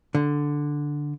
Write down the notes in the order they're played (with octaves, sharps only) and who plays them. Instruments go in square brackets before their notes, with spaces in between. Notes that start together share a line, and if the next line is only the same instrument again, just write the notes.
[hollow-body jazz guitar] D3